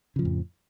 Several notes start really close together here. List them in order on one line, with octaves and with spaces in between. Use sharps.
C#3 F3 A2 F2